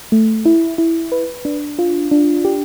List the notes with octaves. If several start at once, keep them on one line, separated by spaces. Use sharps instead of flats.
A3
E4
E4
B4
D4
F4
D4
G4